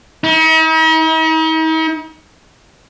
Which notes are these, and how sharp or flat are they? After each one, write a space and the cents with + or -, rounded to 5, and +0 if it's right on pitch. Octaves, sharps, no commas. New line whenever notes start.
D#4 +45